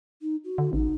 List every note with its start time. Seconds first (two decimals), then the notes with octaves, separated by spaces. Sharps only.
0.22 D#4
0.44 F#4
0.58 D3
0.73 A1 D#4